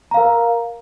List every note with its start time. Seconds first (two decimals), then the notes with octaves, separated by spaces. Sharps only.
0.11 A#5
0.14 F5
0.17 A#4